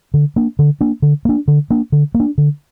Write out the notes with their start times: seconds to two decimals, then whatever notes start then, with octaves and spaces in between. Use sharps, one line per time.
0.14 D3
0.36 A#3 D4
0.59 D3
0.81 A#3 D4
1.02 D3
1.25 A#3 D4
1.48 D3
1.70 A#3 D4
1.92 D3
2.15 A#3
2.20 D4
2.38 D3